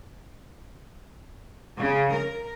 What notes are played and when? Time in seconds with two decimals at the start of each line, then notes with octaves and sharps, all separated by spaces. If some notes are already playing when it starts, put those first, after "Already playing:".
1.79 C#3
2.15 A#4